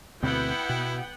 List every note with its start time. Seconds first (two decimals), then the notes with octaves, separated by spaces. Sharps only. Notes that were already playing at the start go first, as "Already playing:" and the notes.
0.23 D2 B2 B3 C4 E4 F#5 G5
0.69 B2